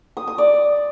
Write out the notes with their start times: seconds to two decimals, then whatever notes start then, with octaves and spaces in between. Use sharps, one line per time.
0.17 D#6
0.27 D#6
0.38 D5